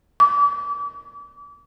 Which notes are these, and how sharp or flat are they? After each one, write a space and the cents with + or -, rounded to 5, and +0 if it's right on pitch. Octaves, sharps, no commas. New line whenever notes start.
D6 -35